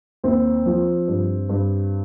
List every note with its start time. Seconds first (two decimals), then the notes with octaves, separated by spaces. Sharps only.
0.24 D#2 C4
0.66 F3
1.08 G2
1.49 G2